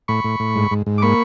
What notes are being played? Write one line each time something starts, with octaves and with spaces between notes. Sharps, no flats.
A2 B5 C#6
A2
A2
G#2
G#2
G#2
D6
A#3 B5 C#6